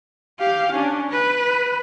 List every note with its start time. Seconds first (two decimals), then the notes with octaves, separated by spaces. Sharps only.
0.38 G4 F5
0.72 C#4 D4
1.10 B4